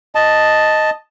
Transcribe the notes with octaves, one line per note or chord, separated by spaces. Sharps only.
D#5 A5